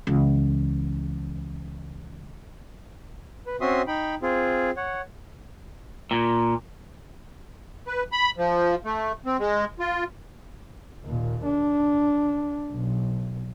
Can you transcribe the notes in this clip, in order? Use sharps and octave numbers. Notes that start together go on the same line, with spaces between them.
C#2 E3
B4
C4 C#4 F#4 E5 C6 D#6
D#4 G5 B5
C4 F4 G#4
C#5 F#5
A#2
B4
B5
F3
A3
C4
G#3
F4
D#2 A#2
D4
B1